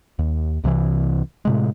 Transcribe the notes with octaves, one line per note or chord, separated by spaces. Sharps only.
D#2
C2 C3 D#3 E3
A2 C3 G#3